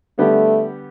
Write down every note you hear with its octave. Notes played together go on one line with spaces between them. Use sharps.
D3 G3 A3 B3 G4